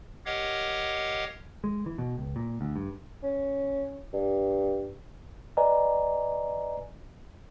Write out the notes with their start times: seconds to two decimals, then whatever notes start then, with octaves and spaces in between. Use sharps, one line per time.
0.26 G4 A#4 C#5 D#5 F5 F#5
1.64 G#3
1.86 E3
1.98 B2
2.18 C#2
2.36 A#2
2.61 D2
2.76 G2
3.23 C#4
4.13 G2
5.57 B4 D5 D#5 G#5 A#5